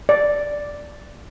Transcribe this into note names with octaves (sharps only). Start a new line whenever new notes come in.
D5